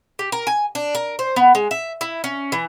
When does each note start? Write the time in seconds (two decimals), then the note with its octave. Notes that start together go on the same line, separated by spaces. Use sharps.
0.19 G4
0.32 A#4
0.47 G#5
0.75 D4
0.95 A#4
1.19 C5
1.36 B3
1.55 G#3
1.71 E5
2.01 E4
2.24 C#4
2.52 E3